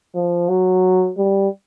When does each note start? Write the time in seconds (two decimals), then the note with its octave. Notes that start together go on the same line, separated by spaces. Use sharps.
0.15 F3
0.49 F#3
1.18 G3